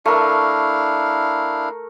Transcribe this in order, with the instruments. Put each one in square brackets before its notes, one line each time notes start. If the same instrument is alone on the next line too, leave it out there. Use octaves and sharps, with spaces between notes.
[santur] A3 A#4 [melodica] D4 E4 F5